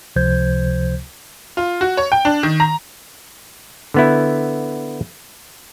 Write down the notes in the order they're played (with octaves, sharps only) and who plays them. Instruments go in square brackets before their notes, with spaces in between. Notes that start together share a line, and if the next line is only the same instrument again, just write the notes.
[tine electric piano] C#2 C3 F3 C5 G6 G#6
[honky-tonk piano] F4
F#4
C#5
G5
D4
D#3
A#5
[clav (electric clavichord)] D3 B3 E4